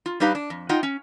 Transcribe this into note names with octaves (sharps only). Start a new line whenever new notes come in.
F4
G3 D4 D#4 G4 B4 F5
D4
F2
D#4 F4 D#5 F#5 G5
C#4